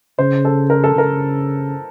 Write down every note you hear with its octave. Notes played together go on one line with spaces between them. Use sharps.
C#3 C5
A4
A#4
A4
C#3 A#4